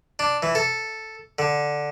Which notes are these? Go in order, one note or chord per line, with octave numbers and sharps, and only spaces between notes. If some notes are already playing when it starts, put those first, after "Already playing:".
D4
E3
A4
D3